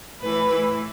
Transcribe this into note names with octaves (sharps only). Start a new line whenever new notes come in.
A2 E3 B4
A2 E3